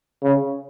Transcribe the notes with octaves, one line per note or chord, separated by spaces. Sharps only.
C#3